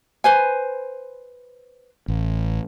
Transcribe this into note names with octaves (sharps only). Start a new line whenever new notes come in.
B4 C5 G#5
A1